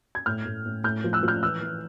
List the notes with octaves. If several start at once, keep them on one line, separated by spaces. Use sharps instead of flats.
G#6
A2 F6 G6
A2
A2
A2 F6 G6
F3
E6 F#6
F3
F6 G6
E3 E6 F#6
E3